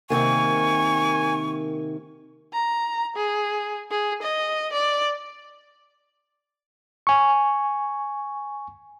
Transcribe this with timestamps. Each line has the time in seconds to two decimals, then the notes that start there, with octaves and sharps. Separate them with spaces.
0.10 C3 D#3 A#3 G#5 C#6
2.53 A#5
3.16 G#4
3.91 G#4
4.23 D#5
4.73 D5
7.07 G#5 C#6